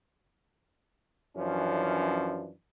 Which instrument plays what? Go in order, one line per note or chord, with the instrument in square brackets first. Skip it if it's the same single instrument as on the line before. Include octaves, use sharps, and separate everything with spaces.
[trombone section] F#2 E3 F3 C#4 D4